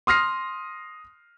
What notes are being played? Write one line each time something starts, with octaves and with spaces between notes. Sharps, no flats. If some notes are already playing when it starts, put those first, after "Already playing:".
C6 D#6 F6 A#6 C7